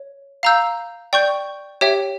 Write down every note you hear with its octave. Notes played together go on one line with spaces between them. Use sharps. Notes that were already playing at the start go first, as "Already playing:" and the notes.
Already playing: C#5
F5 A#5 E6 G6
D5 G5 C#6 G6
G4 C#5 E5 G5